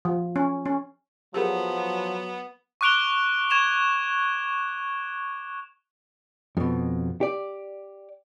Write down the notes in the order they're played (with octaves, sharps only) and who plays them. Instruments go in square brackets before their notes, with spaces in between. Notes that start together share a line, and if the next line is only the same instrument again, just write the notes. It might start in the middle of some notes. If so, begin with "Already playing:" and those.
[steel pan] F3
C#4
C#4
[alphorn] F3 [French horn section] F#3 [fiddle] B3 [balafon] G4 G#4 A#4
[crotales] C#6 D6 F#6 D7 F7 G7
C#6 G#6 E7 F7
[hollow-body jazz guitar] F2 B2
G4 D5